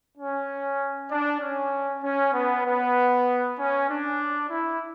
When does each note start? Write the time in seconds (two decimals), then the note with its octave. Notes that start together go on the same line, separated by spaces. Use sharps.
0.16 C#4
1.09 D4
1.40 C#4
2.02 C#4
2.33 B3
2.64 B3
3.57 C#4
3.87 D4
4.50 E4